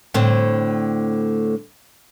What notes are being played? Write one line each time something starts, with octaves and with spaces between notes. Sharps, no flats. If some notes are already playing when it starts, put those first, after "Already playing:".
A2 D3 C4